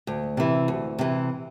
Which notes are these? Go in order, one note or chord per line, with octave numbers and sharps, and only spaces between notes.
D2
C3 E3
D2
C3 E3